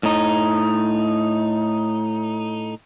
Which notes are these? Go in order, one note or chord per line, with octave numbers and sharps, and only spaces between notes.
A2 D#4